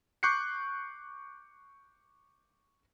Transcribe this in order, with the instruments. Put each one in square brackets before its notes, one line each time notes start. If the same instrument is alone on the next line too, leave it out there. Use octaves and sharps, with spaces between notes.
[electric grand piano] C#6 D6 F#6 G6 C7 C#7